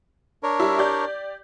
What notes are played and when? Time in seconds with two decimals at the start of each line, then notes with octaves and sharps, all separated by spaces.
0.43 D4 A#4 C#5
0.60 G3 E4
0.78 G4 D5 G6